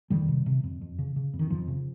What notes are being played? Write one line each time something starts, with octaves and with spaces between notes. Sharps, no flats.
F2 D#3 G3
C3
C3
F2
F2
C#3
C#3
F2
D#3
F2 F3
C#3